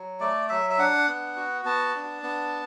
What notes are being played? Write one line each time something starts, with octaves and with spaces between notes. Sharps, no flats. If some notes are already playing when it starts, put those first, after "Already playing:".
Already playing: F#3
A3 D5
F#3 E5
E5
D4 F#5
B3
F#4
B3 A5
D4
B3